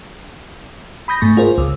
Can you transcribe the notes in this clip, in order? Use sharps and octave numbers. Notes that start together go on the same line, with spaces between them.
B5 D#6 G6 A#6
G#2 A3 C#6
F4 G#4 A#4 C5
C#2